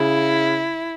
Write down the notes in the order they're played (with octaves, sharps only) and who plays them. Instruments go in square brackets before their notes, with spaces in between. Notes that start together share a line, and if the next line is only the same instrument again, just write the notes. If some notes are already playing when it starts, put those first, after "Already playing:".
Already playing: [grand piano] C#3 [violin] E4